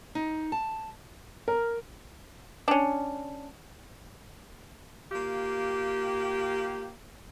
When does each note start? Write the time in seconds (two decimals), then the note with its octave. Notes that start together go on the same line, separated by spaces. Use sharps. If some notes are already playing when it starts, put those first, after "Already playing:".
0.15 D#4
0.52 A5
1.48 A#4
2.68 C#4 D4
5.12 A#3 F4 G4